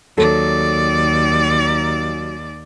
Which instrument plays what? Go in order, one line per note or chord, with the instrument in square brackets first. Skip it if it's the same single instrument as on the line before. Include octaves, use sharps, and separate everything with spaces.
[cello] D#2 D5 [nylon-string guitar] F#3 A4